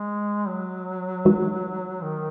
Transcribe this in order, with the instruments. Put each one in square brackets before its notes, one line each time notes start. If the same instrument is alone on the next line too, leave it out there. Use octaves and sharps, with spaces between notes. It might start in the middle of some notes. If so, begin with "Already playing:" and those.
Already playing: [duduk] G#3
F#3
[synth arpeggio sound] E3 G#3 D#4 F#4
[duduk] D#3